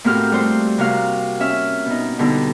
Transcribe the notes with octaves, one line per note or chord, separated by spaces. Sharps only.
A2 A#3 C4 F#4 G4 F6
G3 A3 F4 F#4 C5
C3 A#3 F#4 F5 F6
C#4 E5 F6
B2 D#4
B2 D3 G3 D#4